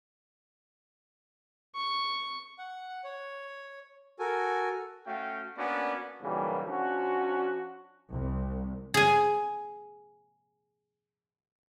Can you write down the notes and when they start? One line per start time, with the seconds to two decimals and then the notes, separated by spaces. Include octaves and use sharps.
1.75 C#6
2.59 F#5
3.04 C#5
4.19 F#4 A4 A#4 G#5
5.07 A3 C#4 F#4 F5 G5
5.57 A#3 B3 C#4 D4 F#4 D5
6.21 B1 F#2 C#3 E3 G3 A#3
6.66 F3 C#4 D4 F4 F#4
8.13 C2
8.94 G#4 G#5